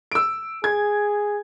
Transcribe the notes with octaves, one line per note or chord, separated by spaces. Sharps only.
E6 D7
G#4 G#6